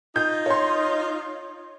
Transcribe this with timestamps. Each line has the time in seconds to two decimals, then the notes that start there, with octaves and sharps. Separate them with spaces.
0.16 D#4 F4 G6
0.46 C#5 C6